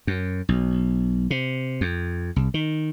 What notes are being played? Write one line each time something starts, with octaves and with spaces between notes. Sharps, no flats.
F#2
B1
C3
F2
C2
D#3